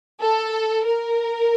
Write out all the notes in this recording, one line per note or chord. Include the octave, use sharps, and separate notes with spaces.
A4
A#4